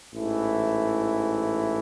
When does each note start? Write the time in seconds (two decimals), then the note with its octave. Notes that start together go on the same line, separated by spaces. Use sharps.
0.14 A1 G#2 E3 A3 E4